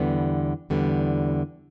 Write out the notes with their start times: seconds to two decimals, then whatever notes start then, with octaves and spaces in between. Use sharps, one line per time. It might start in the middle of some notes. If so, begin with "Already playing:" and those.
Already playing: E2 D3 G3 B3
0.70 E2 D3 G3 B3